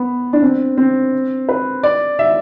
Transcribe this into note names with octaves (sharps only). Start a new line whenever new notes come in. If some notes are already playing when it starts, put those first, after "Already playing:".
Already playing: B3
D4
C4
C4
B4
D5
E5